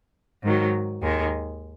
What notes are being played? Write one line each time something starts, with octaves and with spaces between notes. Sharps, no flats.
G#2 D#3 F#3
D#2 D#3 G#3